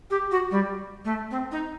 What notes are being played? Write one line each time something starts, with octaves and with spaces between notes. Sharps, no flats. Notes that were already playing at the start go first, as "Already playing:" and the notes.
G4
F#4
G3
A3
C4
D#4